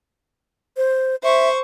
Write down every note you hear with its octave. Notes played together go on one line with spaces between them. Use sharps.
C5
C5 E5 C#6